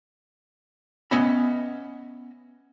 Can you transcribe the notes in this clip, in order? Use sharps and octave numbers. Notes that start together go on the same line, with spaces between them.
B3 C#4 D#5 E5 B5